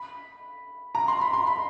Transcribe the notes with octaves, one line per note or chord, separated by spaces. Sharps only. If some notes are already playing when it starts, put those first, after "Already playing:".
Already playing: B5
A#5
C6
B5
C6
B5